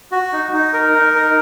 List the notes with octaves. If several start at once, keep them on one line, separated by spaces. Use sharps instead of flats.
F#4
D#4
D#4
A#4
D#4
A#4